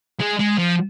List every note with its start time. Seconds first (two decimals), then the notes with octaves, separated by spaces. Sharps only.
0.20 G#3
0.39 G#3
0.58 F3